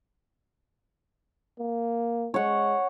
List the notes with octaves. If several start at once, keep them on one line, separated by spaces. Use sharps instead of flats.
A#3
G#3 C#5 F#5